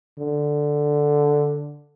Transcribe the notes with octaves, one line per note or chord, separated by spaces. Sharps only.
D3